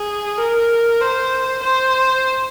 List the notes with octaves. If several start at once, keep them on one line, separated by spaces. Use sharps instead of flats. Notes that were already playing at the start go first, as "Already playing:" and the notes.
Already playing: G#4
A#4
C5
C5